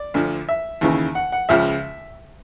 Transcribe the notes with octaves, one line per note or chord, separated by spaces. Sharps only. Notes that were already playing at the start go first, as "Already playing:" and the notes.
Already playing: D5
D2 D3 F3
E5
D#2 C#3 E3
F#5
F#5
C#2 C#3 F3 E5